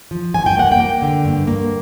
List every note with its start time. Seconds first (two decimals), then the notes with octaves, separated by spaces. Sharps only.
0.11 F3
0.34 G2 G#5
0.46 G5
0.57 A#3 F#5
0.72 G5
0.80 A#3
1.02 D3
1.25 G2
1.47 A#3